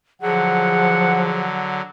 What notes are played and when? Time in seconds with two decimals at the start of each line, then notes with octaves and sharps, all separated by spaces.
0.22 D3 F3 F#3 G#4 F#5